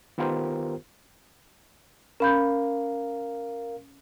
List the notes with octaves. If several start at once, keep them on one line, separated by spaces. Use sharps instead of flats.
D#3 B3 F4 G4 A#4 C5
C#4 A#4 F5 B5 G6